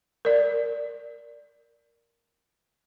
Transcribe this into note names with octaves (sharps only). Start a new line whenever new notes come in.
A#4 D5